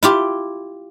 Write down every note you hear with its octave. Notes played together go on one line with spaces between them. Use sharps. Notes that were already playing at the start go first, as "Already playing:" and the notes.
E4 F4 G4